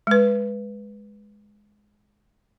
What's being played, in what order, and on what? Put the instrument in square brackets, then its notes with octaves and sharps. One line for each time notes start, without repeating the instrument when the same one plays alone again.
[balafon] G#3 B4